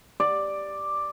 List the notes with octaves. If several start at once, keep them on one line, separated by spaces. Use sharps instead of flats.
D5